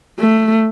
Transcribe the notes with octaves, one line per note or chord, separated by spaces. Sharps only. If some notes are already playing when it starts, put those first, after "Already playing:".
A3